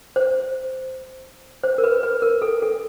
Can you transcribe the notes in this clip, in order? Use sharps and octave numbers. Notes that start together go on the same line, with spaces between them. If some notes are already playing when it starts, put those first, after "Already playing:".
C5
C5
A#4
B4
B4
A#4
A4
A4